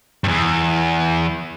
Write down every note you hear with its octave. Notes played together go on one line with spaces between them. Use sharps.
E2 G2